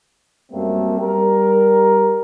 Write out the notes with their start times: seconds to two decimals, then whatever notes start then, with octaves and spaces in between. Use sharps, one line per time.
0.52 F#2 G3 A3 A#3 C4
0.99 G3 A#4